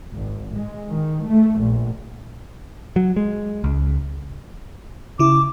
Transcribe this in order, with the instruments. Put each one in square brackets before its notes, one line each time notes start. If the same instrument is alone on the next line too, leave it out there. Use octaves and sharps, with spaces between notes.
[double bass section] G#1
G#3
D#3
A3
A#1
[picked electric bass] F#3
G#3
C#2
[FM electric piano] C#3 E4 [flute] D6